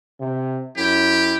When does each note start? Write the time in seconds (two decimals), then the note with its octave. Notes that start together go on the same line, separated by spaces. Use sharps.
0.20 C3
0.77 F#2 E4 G4